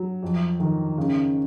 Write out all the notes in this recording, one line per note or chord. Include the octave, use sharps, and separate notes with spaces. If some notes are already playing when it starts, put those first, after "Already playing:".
Already playing: F#3
F2
D#3
C#3